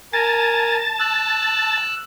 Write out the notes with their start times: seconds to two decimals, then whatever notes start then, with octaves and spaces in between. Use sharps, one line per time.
0.13 A#4 G#5 A5 A6
1.00 E6 F#6